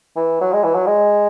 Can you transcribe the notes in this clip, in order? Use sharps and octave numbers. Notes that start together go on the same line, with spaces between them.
E3
F#3
G#3
E3
F#3
G#3